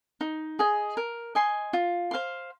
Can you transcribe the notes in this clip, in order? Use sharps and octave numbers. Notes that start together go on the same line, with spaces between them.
D#4
G#4 D#5 G#5
A#4
D#5 G#5 C6
F4
C5 F5 C6